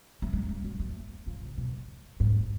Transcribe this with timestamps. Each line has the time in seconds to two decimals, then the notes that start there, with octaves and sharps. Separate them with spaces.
0.22 A3
0.33 G#3
0.49 G3
0.64 F#3
0.80 A3
1.27 F3
1.42 C3
1.58 B2
2.20 G#2